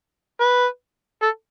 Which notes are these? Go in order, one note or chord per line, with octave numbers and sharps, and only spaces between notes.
B4
A4